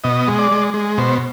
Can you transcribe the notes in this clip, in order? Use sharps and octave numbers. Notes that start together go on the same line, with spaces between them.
B2 D#5
G#3
D5
G#3
G#3
B2 C5